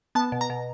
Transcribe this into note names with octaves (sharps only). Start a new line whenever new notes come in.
B3 A5
B2
A#5
B2